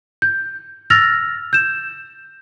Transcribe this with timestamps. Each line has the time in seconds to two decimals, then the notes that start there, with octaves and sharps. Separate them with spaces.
0.22 G6
0.90 E6 F6 A6 A#6 F7
1.53 G6 E7